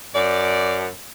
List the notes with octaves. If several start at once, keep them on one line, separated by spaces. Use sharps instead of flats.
F#2 D5